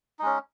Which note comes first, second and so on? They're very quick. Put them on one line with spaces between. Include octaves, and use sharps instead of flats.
D#4 G#3 C#4